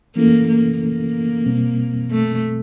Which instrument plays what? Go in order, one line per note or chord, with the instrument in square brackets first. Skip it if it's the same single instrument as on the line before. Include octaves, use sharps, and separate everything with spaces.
[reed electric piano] E3 A3 C#4 E4 A4 [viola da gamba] A#3
[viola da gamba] A#3
A#3
[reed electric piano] B2 G3 C4
[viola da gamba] A3